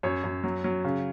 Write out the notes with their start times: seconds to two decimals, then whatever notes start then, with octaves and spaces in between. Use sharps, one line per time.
0.03 F#2 C#5
0.24 F#2
0.44 F#3
0.64 F#3
0.84 C#3